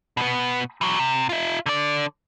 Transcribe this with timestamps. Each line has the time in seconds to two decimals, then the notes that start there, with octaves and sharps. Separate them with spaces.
0.17 B2 B3
0.81 E3 F#3
0.99 C3
1.29 F4 E5
1.66 D3 D5